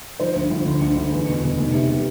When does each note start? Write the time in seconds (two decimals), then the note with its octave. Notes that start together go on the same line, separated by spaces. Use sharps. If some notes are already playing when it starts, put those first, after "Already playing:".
0.20 F3 C5
0.36 D2
0.51 D2
0.66 D3
0.81 D2
0.97 D2
1.12 E2
1.28 B2
1.44 B2
1.59 F1
1.74 C3
1.89 C3